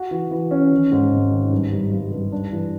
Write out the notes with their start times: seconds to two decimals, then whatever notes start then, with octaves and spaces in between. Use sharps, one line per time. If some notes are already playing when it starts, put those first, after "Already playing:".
Already playing: F#4
0.11 E3
0.31 E3
0.51 C#4
0.72 D#3
0.92 G#2
1.11 G#1
1.31 D#3
1.51 G2
1.72 G2
1.92 G2
2.12 G2
2.32 D4
2.52 E3